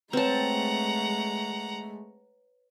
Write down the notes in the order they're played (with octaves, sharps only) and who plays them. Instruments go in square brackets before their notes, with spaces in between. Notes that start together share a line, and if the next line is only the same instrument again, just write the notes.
[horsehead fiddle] G#3 A3 [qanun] C4 A5 [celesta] B4 C#5 [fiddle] F#5 A#5